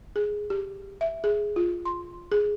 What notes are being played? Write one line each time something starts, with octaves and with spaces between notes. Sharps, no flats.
G#4
G4
E5
G#4
F4
C6
G#4